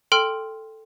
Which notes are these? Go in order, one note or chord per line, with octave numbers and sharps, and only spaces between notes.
A4 G5 C6 F6 D7